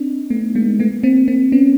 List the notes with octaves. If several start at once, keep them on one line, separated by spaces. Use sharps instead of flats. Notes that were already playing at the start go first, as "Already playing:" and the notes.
Already playing: C4 D4 D#4
A3 B3
G#3 A#3
A3 B3
A#3 C4
A#3 C4
B3 C#4